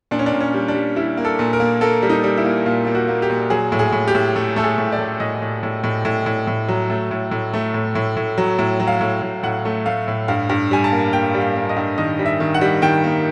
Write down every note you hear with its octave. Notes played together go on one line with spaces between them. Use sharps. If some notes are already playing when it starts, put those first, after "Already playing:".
A#2 D4
C#4
D4
A#2
C#4
G3
D4
G3
G3 E4
A#3
A4
A#2
A#4
A#3
A#3 A4
G3
D#4
G3
E4
A#3
A#2 F4
A#3 F4
F#4
A#3
G4
A#2
F#3 G#4
A2
G#4
A2
G4
A2
A3
A3 A4
G#4
A2
D5
A3
A2 D#5
A2
A2
A2
A2
A2
A2
F#3
A3
A2
A2
A3
A2
A2
A2
F#3
A2
F#3
F5
A2
A2
A2 F#5
A3
A3 F5
A2
G2 F5
G2
G3 G#5
A5
A#3
A#3 G5
G3
F5
A#3
D#5
G2
D#3 D#5
G3
E5
D#3
F#5
G3
D#3 G5
A#3